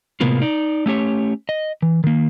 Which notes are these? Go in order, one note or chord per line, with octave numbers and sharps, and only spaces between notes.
A2 C3 G#3 A#3 B3 F4
D#4 D5
A3 C#4 G4 C#5
D#5
E3
D#3 A#3